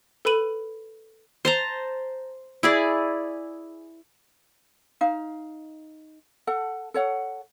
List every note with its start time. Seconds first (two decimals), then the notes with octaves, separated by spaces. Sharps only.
0.25 A4 B4 B5 D#7 F#7
1.45 C5 A5 A#5
2.63 E4 G#4 D5
5.01 D#4 F5
6.47 A4 F#5
6.94 A4 C#5 F#5